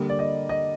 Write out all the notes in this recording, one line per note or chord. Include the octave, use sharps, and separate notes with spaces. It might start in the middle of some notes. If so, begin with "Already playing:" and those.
Already playing: D3 G3 A#3
D5
D#5
D#5